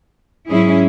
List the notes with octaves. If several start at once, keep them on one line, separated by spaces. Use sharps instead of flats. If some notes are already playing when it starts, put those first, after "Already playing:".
G#2 F#3 C#4 E4 G#4